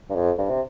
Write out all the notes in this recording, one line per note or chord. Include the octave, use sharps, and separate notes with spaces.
G2
F2
G2
C3